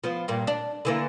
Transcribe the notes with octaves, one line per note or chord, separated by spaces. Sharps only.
F3 B3
G2 A#2
D4
D3 E3 A#3